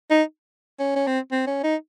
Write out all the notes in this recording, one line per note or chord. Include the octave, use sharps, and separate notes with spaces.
D#4
C#4
C#4
C4
C4
C#4
D#4